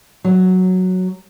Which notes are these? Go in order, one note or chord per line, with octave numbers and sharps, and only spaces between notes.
F#3